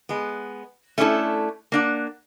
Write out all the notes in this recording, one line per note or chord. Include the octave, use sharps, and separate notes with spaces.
G#3 B3
A3 C#4 D4 E4 A4
A#3 D4 F#5